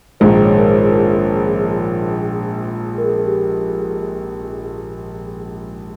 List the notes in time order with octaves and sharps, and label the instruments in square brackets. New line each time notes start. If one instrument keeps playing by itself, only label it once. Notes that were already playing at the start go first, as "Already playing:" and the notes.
[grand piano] A#1 G#2 D#3 G#3 [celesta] C5
[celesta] C#5
A#4
C5
A#4
G#4
A#4
G#4
G4